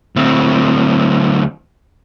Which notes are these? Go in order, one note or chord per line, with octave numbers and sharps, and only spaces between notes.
D2 C4